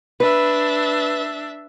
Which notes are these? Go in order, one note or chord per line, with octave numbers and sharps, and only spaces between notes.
D4 B4 E5